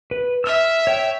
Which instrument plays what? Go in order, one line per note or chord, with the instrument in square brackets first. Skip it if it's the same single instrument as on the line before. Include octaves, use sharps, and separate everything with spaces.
[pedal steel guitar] B4
[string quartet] E5 [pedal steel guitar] E6 F6
[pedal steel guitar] C#5 G5